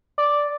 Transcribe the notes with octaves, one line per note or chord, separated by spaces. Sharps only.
D5